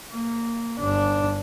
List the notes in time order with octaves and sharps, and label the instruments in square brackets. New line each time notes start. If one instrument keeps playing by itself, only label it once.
[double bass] A#3
G1 D4